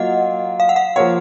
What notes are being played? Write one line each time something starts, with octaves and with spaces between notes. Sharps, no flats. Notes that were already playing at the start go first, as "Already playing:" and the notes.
Already playing: F#3 A#3 F4 D#5 F#5
F5
F#5
F5
F3 A#3 F4 A#4 C#5 F#5